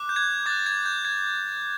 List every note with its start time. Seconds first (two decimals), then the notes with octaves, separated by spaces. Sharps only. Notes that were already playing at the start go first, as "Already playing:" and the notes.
Already playing: D6 F#6
0.09 G6
0.16 G#6
0.46 D6 A6
0.50 F#6
0.59 A6
0.66 G#6
0.86 G6
1.05 G#6